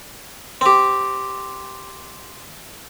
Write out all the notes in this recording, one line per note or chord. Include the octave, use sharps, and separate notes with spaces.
C4 G4